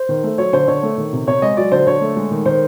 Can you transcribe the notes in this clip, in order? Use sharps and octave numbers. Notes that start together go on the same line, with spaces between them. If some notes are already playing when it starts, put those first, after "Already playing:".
Already playing: C5
D#3
A3
F#3 C#5
D3 C5
D3 C#5
A3
D#3
C3
C3 C#5
G#3 D#5
F#3 D5
D3 C5
D3 C#5
A3
G#3
D#3
D#3 C5